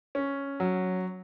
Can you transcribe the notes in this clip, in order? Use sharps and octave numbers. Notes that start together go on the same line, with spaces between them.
C#4
F#3